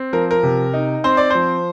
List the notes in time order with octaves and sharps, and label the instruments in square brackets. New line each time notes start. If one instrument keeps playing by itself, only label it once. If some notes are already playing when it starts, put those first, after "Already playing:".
Already playing: [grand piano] C4
F3 A#4
A#4
C3
D#4
C4 C5
D5
F3 C5